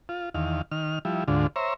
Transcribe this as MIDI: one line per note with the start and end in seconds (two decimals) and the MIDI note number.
0.09 0.29 65
0.34 0.62 40
0.34 0.62 51
0.34 0.62 77
0.71 0.99 51
0.71 0.99 89
1.05 1.24 53
1.05 1.24 55
1.05 1.24 64
1.28 1.47 38
1.28 1.47 44
1.28 1.47 50
1.28 1.47 65
1.56 1.74 72
1.56 1.74 73
1.56 1.74 76
1.56 1.74 82